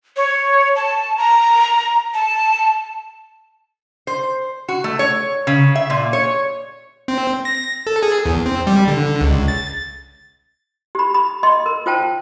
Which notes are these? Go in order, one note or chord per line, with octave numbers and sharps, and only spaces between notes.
C#5
A5
A#5
A5
C5
F#4
A3
C#5
C#3
E5
A#2
C#5
C4
A#6
A4
G#4
E2
C4
G3
D3
C#2
A6
G4 B5
B5
D#5 C6
A#4
F4 C5 G5 A5